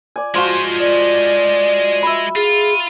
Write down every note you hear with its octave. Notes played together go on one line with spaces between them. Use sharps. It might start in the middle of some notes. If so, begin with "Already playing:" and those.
D5 G#5
F3 G#3 F4 F#4 C5
D5
E5 B5
F4 G#4